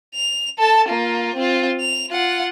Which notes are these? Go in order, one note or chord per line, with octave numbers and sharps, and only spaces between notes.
F7
A4 A5
A#3 F4
C4 F4
F7
F4 F#5